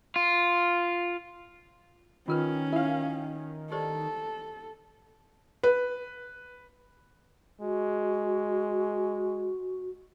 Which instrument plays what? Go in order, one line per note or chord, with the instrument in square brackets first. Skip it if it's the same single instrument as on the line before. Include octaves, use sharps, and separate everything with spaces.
[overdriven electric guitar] F4
[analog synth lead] D#3 [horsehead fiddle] C#4 [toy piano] F4 A#4 B4
[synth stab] E4 F5 [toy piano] A#4
[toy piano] G4 C5 D5 [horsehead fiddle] A4
[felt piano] B4
[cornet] G#3 [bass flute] F#4